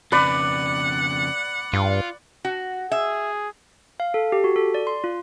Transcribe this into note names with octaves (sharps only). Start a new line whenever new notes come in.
F2 C#3 B4 D5 F#5
G2 F4
F#4
G#4 E5
F5
A4
G4
F#4
A4
D5
C6
F4